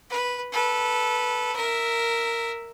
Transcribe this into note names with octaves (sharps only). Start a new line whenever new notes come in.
B4
A4 B4
A#4 E5